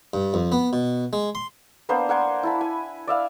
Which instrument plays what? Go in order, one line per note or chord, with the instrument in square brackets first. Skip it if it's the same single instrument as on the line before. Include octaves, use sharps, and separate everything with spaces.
[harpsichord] G2
F2
B3
B2
G#3
C6
[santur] A#3 B3 D4 C5
A#4 F#5 G#5 C6
E4 A5 B5
G#5
D5 E5 F5